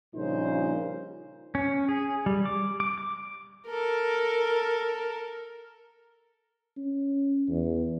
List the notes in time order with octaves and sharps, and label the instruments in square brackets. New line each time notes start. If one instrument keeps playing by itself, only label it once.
[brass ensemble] A#1 A#2 C#3 G3 D#4 C5
[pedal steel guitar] C#4
G#4
G3
D6
D6
D6
[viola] A4 A#4
[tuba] C#4
E2